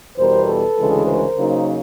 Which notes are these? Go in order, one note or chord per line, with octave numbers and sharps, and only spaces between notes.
E2 B2 G3 A#4 C5
A4 B4
D2 C#3 E3 G#3
A#4 C5
C#3 F#3 A#3 D#4